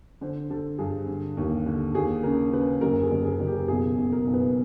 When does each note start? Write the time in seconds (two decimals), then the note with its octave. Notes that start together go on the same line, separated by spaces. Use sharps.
0.21 D3 C5
0.50 D3 A4
0.78 G2 G#4
1.07 D3
1.37 D#2
1.66 D3
1.94 D#2 G#4
2.23 C#3 A#4
2.53 C#3 B4
2.81 F#1 A#4
3.03 G#4
3.11 F#1
3.25 G#4
3.40 F#1
3.47 G4
3.68 B1 G#4
3.97 B1
4.12 A#4
4.26 B1
4.34 B4